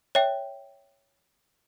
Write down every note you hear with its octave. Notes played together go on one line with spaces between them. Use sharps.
C#5 E5 G5